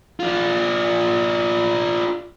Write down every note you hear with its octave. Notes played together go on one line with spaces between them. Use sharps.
D4 F4